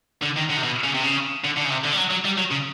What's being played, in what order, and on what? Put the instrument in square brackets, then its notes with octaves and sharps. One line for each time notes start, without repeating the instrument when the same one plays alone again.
[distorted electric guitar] D3
D#3
D3
C3
B2
C#3
C3
C#3
D3
D3
C#3
C3
D3
G3
F#3
F#3
G3
F#3
C#3